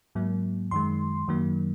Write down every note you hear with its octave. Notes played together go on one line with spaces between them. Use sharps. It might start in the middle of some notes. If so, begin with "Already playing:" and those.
G#2 F#3 A#3
F#2 D#3 G#3 C6
F#2 D#3 F#3 A#3